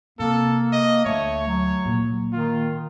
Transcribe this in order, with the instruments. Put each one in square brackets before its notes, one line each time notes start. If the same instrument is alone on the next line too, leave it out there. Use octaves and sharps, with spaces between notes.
[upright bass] C3 [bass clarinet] A#3 [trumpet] A4
[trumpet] D#5
[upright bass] D2 [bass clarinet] A3 [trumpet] C#5
[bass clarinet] F#3
[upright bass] A#2 A#3
[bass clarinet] D#3 [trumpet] F4